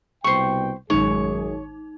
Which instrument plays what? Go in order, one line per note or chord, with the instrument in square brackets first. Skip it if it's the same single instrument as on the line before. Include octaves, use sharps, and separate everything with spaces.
[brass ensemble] C2 B2 G5 [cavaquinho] C5 C#6
[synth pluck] A1 D#3 G#3 [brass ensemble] F#2 G#4 [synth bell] D#4 [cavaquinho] C#5